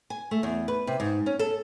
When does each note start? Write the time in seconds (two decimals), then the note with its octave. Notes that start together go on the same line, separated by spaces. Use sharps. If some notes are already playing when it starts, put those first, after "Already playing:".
0.10 G#5
0.31 A3
0.43 E2
0.68 B4
0.87 C3
1.00 G#2
1.26 C#4
1.39 A4